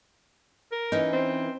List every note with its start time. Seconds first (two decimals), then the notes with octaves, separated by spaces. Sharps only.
0.72 A#4
0.92 E3 C#4 D#4
1.13 C4